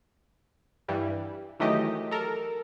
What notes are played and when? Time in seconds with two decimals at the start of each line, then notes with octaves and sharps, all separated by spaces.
0.88 G2 E3 G3
1.60 D#3 E3 F#3 A3 G4 D#5
2.11 A4 A#4